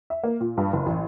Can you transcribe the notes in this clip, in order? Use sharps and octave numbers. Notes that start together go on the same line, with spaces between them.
E5
A#3
A#2
G2
F#1
A1